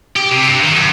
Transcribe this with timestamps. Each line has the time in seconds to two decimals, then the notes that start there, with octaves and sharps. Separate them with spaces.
0.16 G4
0.32 C3
0.47 G2
0.64 D#3
0.76 F#2